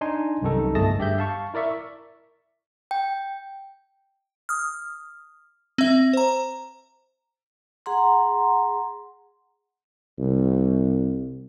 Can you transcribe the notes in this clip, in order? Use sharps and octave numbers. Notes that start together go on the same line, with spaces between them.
D4 D#4 G#5 C6
C2 F#2 C3 D#3 D#4 A4
G1 A3 G#4 D#5 A5 A#6
G2 G4 E5 G6
F5 A5 C#6
E4 A#4 D5 E5 C#6
G5
D#6 F6
C4 E5
C5 A#5
G#4 F#5 A#5 C6
C2